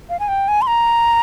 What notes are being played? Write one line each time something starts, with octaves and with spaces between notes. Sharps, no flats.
F5
G#5
G5
G#5
C6
A#5